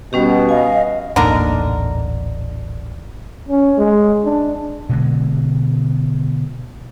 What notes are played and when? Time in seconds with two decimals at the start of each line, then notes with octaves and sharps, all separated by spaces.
0.13 B2 G3 C#4 G4
0.49 D#5 F5 G#5
1.16 D#1 A1 D3 A#3 D#4 A#4
3.48 C#4
3.78 G#3
4.25 D4
4.89 B2 D3 G#3